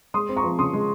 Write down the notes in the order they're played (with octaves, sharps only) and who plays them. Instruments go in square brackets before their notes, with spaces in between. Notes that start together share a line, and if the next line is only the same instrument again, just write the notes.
[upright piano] G#3 C6 D#6
C4
A#5 C#6
F3
C#3 C6 D#6
G#3